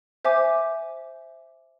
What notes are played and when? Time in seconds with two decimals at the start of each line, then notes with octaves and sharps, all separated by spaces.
0.25 C5 E5 G#5 D6